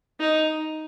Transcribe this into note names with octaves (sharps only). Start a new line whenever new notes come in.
D#4